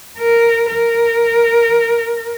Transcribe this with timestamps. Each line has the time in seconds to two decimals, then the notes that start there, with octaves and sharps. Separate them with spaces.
0.19 A#4
0.70 A#4